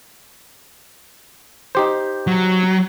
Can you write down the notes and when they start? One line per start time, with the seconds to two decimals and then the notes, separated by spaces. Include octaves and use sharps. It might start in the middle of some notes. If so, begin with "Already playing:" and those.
1.75 D#4 G4 C5
2.27 F#3